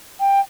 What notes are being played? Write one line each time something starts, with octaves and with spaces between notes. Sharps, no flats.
G5